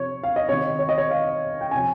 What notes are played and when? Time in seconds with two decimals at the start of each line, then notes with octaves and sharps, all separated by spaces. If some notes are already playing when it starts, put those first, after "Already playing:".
Already playing: C3 F3 C#5
0.23 F5
0.36 D#5
0.49 C3 D#3 C#5
0.79 C#5
0.89 D#5
0.98 C#5
1.11 F5
1.61 G5
1.71 C3 G#5
1.77 F3